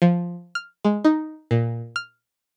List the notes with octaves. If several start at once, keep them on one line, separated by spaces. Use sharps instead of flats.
F3
F6
G#3
D#4
A#2
F6